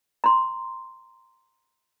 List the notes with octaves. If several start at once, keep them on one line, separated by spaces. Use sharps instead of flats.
A#5 C6